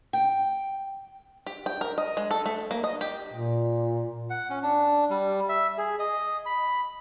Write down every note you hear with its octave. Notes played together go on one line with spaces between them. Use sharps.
G5
G4
G5
A#4
D#5
G#3
A4
A3
A#3
D#5
G4
A#2
F#5
C#4
D4
G3
E5
G#4
D#5
B5